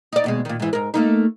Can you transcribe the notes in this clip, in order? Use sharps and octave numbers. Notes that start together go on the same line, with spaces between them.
D#4 D5
D#2 B2 G#3
A#2 D#3
G#2 E3
G#2 A#4
A3 A#3 D#4